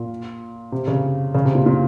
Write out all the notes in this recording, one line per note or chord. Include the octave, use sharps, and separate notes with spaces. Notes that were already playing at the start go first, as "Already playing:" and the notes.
Already playing: A#2
C3
C#3
C#3
C3
A#2
A#2